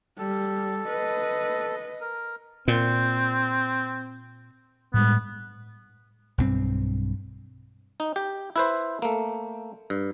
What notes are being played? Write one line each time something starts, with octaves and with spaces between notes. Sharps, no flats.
G3 A4
B4 D#5
A#4
A#2 C4
A2 G3 G#3 B3
B1 G2 C4
D#4
G4
E4 B4 C5
A3 A#3
G2